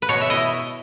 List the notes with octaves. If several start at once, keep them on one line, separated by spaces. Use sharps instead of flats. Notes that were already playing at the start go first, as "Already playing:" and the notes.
B4
B2 C#5
E5
E4 D#5